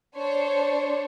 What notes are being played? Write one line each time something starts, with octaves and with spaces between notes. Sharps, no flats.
D4 C5 C#5